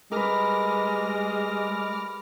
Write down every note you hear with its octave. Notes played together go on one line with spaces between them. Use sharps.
G3 G#3 A#4 B4 D6 F6 A#6